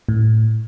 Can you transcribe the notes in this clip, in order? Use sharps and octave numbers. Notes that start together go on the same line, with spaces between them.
A2